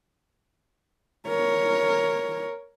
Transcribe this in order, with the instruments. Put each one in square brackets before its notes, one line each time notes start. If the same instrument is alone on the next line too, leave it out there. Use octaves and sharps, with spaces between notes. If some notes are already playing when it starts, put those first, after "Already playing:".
[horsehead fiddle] A#4 C#5